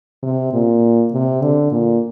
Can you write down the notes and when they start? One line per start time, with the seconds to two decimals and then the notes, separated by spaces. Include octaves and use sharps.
0.23 C3
0.53 A#2
1.12 C3
1.42 D3
1.72 A#2